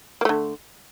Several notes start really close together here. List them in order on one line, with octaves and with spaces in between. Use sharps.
A#3 A3 D3